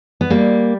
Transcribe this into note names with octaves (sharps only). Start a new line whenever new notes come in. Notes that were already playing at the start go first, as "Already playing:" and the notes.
B3
G3 A#3